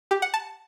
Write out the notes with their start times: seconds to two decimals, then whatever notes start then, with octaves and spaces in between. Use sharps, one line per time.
0.11 G4
0.22 F#5
0.34 A5